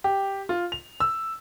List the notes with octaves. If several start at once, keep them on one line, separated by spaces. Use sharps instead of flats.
G4
F4
F7
E6